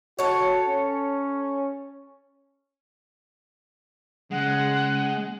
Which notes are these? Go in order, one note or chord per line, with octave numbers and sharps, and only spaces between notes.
F#4 A4 C#5
C#4
C#3 G#3 F#5